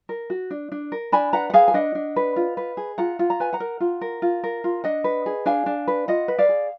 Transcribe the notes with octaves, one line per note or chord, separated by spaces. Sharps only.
A#4
F#4
D4
D4
A#4
D4 G#5 B5
B4 F#5 A#5
F#5
G#4 F5 G#5
G#5
D4 D#5 F#5
D4
B4
F4
B4
G#4
F4 F#5 A#5
F4
A#5
B4 G#5
F#5 A#5
A#4
F4
A#4
F4
A#4
F4
D4 D#5 F#5
B4
G#4
D4 F5 G#5
D4
B4
F4 D#5 F#5
B4
D5 F5
G#4